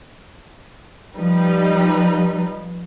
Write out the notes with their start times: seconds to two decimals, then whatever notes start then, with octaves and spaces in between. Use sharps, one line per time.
1.17 F3 G3 D#4 B4